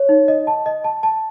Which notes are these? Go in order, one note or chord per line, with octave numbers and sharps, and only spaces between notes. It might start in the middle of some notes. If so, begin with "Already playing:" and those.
Already playing: C#5
D#4
D#5
A5
D#5
A5
A5